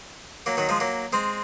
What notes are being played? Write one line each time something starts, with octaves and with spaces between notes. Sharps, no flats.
F#3 A#3
D#3 F#3
F3 G#3
F#3 A#3
G#3 C4